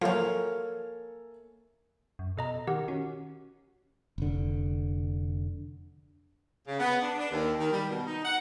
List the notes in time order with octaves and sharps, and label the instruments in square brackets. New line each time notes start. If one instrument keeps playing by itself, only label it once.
[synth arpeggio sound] F3 F#3 [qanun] A#3 C#5 [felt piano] A4 E5 G#5
[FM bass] F#2
[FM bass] B2 [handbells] A4 D#5 A#5
[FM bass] D#3 [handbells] G4 A#4 F#5
[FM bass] C#4 [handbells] F#4
[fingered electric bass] F1 D3
[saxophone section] C#3
B3
D4
D4
D#2
D#3
G3
B2
D#4
F#5